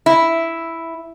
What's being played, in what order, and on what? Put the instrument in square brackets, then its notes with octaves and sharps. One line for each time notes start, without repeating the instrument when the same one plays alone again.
[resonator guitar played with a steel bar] E4